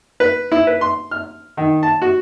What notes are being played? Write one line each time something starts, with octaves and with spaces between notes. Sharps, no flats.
B4
E4
B4
C6
F6
D#3
A5
F#4